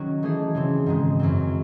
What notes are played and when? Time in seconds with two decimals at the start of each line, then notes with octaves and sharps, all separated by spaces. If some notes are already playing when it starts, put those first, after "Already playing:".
Already playing: D#3 F#3 C#4 F#4
0.23 E3 A3 D#4 G#4
0.55 C#3 E3 C4
0.86 G#2 D#3 G#3
1.20 F#2 E3 C4